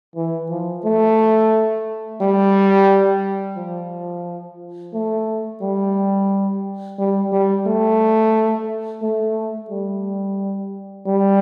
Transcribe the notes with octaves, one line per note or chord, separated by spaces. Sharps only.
E3
F3
A3
G3
F3
A3
G3
G3
G3
A3
A3
G3
G3